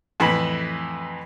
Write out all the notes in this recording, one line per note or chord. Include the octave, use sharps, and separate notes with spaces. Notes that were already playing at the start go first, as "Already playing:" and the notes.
F2 A2 E3 B5